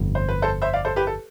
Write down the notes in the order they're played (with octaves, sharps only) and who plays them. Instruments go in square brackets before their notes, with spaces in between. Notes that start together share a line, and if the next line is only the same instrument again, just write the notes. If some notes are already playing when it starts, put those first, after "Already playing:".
Already playing: [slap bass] G1 F2 C3
[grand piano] C5
B4
A4 C5
C5 E5
D5 F5
A4 C5
G4 B4
A4